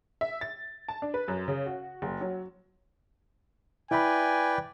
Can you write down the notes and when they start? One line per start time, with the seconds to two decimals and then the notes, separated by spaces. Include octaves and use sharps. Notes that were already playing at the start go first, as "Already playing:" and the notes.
0.21 E5
0.41 A6
0.88 A5
1.02 D4
1.14 B4
1.28 F#2
1.48 C#3
1.66 F#4
2.02 F#1
2.21 F#3
3.91 E4 B4 D5 E5 G5 G#5 B5